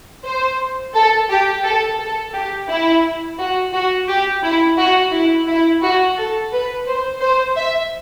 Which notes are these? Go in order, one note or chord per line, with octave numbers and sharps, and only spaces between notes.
C5
A4
G4
A4
A4
G4
E4
F#4
F#4
G4
E4
F#4
E4
E4
F#4
A4
B4
C5
C5
E5